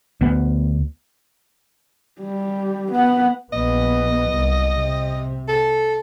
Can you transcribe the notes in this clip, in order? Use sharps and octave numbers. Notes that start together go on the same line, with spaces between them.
D2 B3
G3
B3 F#5
A#1 B3 D#5
C2
C3
A4